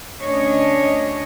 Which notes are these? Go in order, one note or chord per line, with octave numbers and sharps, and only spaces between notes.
D2 C#4 D4 C#5 D#5